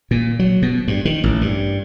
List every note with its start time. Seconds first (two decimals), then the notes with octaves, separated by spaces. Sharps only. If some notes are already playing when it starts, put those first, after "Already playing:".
0.11 A#2
0.39 F#3
0.62 B2
0.88 G2
1.05 D#3
1.24 A1
1.41 G2